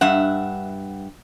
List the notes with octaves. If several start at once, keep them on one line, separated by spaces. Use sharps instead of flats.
G2 E5 F#5